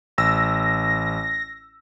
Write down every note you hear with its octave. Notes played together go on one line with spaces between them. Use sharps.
A1 E6 A#6